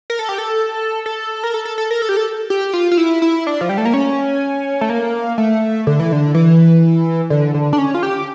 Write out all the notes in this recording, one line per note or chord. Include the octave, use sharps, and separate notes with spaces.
A#4
A4
G4
A4
A4
A#4
A4
A4
A4
A#4
A4
G4
A4
G4
F4
F4
E4
E4
D4
F3
G3
A3
A#3
C#4
A3
A#3
A3
D3
E3
D3
E3
D3
D3
D4
C#4
F4
G4